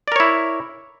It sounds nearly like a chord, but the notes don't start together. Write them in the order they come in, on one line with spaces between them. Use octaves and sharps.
D5 A#4 C#5 E4